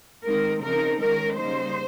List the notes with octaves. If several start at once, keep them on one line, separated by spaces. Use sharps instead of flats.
D#3 G#3 C4 D#4 A#4
C#3 F3 C4 D#4 A#4
D#3 G#3 C#4 A#4
C#3 G3 A#3 D#4 C5